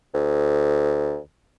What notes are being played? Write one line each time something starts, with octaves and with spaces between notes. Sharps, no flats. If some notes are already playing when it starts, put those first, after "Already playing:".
D2